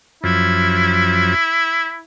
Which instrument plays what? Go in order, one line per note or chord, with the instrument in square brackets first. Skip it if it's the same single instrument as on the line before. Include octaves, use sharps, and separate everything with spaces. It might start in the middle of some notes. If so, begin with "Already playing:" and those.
[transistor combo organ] F#2 F3 [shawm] E4